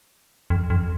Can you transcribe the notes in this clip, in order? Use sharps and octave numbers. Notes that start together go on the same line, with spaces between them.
F2
F2